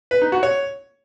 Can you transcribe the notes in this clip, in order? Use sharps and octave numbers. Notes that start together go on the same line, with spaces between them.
B4
D#4
F#4
C#5